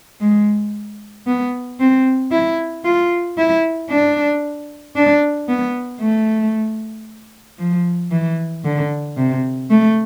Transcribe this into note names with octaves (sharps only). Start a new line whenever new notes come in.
G#3
B3
C4
E4
F4
E4
D4
D4
B3
A3
F3
E3
D3
C3
A3